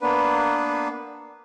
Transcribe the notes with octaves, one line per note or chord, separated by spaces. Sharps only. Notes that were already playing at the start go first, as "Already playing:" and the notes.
A#3 B3 D4 B4